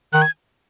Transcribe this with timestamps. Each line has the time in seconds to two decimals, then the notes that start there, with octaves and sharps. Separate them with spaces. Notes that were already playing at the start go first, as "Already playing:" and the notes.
0.13 D#3 F#6
0.22 G#6